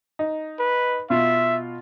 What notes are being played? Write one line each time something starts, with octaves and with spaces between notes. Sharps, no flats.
D#4
B4
B2 F4 E5